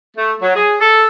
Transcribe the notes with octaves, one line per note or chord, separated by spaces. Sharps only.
A3
F#3
G#4
A4